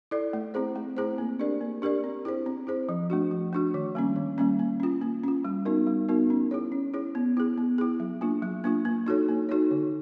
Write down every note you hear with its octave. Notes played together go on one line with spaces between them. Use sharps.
E4 A4 D5
A3
C4 E4 G#4 C5
A3
C4 E4 G#4 C5
A#3
D4 G4 A#4 D5
A#3
D4 G4 A#4 D5
C4
E4 G#4 C5
C4
E4 G#4 C5
F3
A3 D4 F#4
F3
A3 D4 F#4
D#3
G3 A#3 C#4
D#3
G3 A#3 C#4
A#3
C#4 F4
A#3
C#4 F4
G3
B3 D#4 F#4 A#4
G3
B3 D#4 F#4 A#4
C#4
E4 G#4 C#5
C#4
E4 G#4 C#5
B3
E4 G#4
B3
E4 G#4
F#3
A#3 D4 F4
F#3
A#3 D4 F4
A#3
D#4 F#4 A4 C#5
A#3
D#4 F#4 A4 C#5
D3